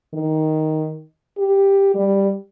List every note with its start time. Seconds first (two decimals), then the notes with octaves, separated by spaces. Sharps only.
0.14 D#3
1.38 G4
1.95 G3